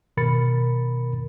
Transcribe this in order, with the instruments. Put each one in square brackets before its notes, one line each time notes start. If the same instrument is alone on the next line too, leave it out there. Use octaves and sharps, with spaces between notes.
[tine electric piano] B2 D#3 A#4 B5 A6 C#7